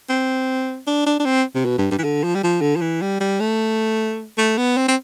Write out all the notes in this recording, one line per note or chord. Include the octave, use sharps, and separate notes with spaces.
C4
D4
D4
D4
C4
C3
B2
G2
G2
E3
D3
F3
G3
F3
D3
F3
E3
G3
G3
A3
A3
B3
C4
C4